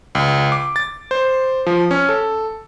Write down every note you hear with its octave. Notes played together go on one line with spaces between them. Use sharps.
C#2
D6
A6
C5
F3
C#4
A4